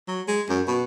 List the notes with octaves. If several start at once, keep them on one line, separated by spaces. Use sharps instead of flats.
F#3
G#3
F#2
B2